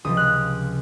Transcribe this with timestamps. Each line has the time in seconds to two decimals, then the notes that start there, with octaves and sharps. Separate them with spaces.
0.04 C#2 C3 F3 D#6
0.17 F6 F#6